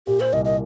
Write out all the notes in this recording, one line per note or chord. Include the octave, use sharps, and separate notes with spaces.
A#2 G4
C5
C2 D#5
D#5